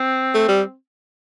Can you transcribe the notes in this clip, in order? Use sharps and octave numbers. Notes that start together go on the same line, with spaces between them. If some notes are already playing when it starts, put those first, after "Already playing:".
Already playing: C4
A3
G3